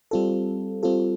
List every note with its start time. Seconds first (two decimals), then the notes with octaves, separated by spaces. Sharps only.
0.11 G3 C4 F4 A4
0.83 G3 C4 F4 A4